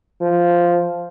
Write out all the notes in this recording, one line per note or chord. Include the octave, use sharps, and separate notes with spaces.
F3